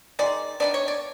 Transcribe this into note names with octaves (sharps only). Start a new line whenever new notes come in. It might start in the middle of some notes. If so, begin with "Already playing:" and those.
D#3 G#3 D5
D#3 G#3 B3 D4 D5
C#5
D5